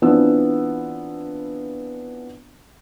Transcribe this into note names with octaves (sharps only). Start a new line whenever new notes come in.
E3 B3 C4 D4 F4 E6